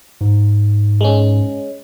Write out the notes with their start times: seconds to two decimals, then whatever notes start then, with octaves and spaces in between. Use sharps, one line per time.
0.21 G#2
1.01 G#3 C#4